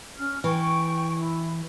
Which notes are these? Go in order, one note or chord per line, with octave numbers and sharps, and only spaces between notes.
C#4 F6
E3 G5 C#6
E4